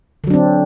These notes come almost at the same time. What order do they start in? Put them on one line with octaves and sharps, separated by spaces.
D3 F#3 D4 C4